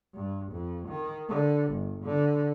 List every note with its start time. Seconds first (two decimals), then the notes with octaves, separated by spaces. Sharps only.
0.14 G2
0.52 F2
0.88 D#3
1.29 D3
1.71 G1
2.03 D3